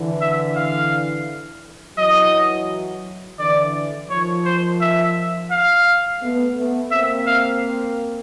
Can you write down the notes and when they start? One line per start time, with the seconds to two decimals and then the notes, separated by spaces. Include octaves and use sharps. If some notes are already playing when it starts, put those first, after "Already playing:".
Already playing: D3 E3
0.21 E5
0.56 F5
1.98 E3 F#3 D#5
3.38 D3 E3 D5
4.10 D#3 F3 C#5
4.45 C5
4.81 E5
5.51 F5
6.21 A3 B3
6.56 A3 B3
6.91 A#3 C4 E5
7.27 F5